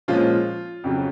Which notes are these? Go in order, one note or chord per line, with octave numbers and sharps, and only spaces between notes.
A#2 F3 G#3 C#4 F4
F2 C#3 F#3